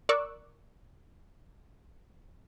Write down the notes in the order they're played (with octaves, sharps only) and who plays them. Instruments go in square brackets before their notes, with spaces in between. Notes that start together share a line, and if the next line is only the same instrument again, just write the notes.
[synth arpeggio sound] A#4 D5 C#6 D6 E6 F#6